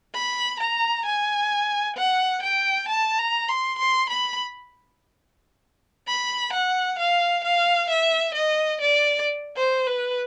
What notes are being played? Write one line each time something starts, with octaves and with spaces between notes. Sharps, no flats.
B5
A#5
G#5
F#5
G5
A5
A#5
C6
C6
B5
B5
F#5
F5
F5
E5
D#5
D5
C5
B4